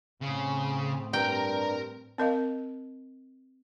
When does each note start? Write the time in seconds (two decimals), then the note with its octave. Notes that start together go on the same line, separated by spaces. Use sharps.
0.22 A2 C#3 C4
1.13 G2 A#4 G5 A#5
2.18 C4 A#4 D#5 F5